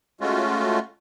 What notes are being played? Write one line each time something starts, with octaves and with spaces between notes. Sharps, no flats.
G#3 A3 C#4 F4 F#4